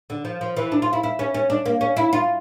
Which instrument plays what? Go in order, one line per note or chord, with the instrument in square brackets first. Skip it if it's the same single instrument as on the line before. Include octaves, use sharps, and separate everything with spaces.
[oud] D3
F3
F3
E3
D4
F4
E4
E4
C#4
C#4
D4
A#3
C#4
E4
F4